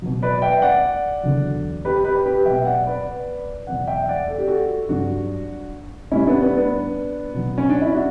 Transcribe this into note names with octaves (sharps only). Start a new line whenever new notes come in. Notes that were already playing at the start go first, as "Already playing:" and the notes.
B2 F#3
B4 D5
E5 G5
D5 F#5
E2 D3 F#3
G4 B4
G4 B4
G4 B4
B2 F#3 E5 G5
D5 F#5
B4 D5
E2 B2 F#3 D5 F#5
E5 G5
D5 F#5
A4
G4
F#4 A4
G2 F#3 D4 F#4
A2 G3 C#4 E4
B3 D4
B3
B3 D4
B2 F#3
C#4
D4
E4
D4 F#4